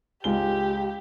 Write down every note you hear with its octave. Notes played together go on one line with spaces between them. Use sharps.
C#2 G#3 G4 G7